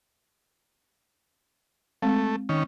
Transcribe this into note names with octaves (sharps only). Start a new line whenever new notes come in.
G#3 A3 C4
D#3 C#4